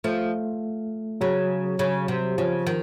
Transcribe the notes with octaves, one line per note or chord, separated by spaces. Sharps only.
F3 A3
C#3 F#3
C#3
C3
C#3 F3
D#3